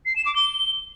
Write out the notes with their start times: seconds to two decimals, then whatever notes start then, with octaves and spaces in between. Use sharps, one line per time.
0.06 C7
0.16 E7
0.26 D6
0.36 G7